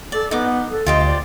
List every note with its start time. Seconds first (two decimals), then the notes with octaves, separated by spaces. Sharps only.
0.12 A4 D5
0.31 B3 D#4 D6
0.70 A4
0.86 D2 F4 G4 C5 D#5
1.06 D5